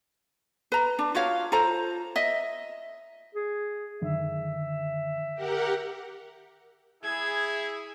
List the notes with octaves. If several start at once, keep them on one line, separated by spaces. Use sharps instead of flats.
B4 A#5
D4
F4 F#4 C#5 F5
F4 A4 C5 A#5
D#5 E5
G#4
F#2 D3 D#3 E5
G4 A#4 F#5
E4 G#4 G#6